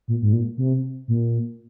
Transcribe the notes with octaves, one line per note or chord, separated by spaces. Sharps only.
A#2
G#2
A#2
C3
A#2